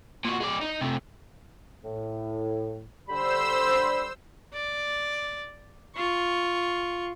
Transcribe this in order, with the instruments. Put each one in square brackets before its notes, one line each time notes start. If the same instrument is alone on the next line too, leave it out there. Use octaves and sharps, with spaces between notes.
[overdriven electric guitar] A#2 F#4
G#3 D5
D#4
C3 A3
[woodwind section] A2
[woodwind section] D3 G3 B5 [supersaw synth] C5 E6
[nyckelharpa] D5
F4 C#6